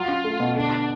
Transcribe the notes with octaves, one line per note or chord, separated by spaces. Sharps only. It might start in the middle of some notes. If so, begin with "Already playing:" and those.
Already playing: F#3 F4
C#4
A3
B2
D3 D4